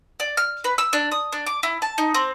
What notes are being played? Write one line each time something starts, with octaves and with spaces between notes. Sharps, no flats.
D5
F6
B4
E6
D4
D#6
D4
D6
E4
A5
D#4
C4